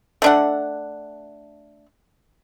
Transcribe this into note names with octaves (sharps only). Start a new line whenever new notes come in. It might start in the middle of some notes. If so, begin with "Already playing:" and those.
A3 D4 F#5